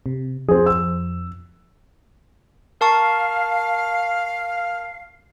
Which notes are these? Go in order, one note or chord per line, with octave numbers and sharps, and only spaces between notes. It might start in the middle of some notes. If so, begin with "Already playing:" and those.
C3
F2 C4 G#4
E6
A#4 F5 A5 C#6